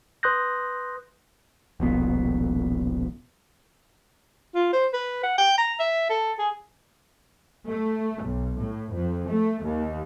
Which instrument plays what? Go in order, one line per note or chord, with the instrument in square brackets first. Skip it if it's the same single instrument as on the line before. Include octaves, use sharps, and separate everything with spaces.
[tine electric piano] B4 C6 D#6 F#6 G6 A#6
[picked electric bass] D#1 A#1 B2
[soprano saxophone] F4
C5
B4
F#5
G5
A#5
E5
A4
G#4
[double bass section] A3
B1
A2
F2
A3
D#2